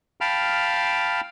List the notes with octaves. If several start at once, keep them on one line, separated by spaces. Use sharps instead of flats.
F5 G5 A5 B5 F6